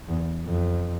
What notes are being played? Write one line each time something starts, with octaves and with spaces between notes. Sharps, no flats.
E2
F2